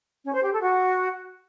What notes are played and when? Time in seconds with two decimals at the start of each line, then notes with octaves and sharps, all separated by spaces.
0.25 C#4
0.34 C5
0.43 G4
0.52 A4
0.61 F#4